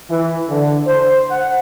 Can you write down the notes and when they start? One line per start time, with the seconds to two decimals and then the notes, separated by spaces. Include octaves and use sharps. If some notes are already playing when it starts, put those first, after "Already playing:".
0.10 E3
0.49 D3
0.87 C5
1.30 F#5